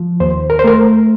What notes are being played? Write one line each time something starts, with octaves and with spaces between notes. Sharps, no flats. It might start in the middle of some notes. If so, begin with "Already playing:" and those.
Already playing: F3
D#2 C5
A#4
C5
A3 A#4